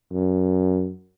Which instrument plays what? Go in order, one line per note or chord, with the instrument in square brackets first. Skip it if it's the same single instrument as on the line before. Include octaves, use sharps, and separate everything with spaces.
[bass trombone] F#2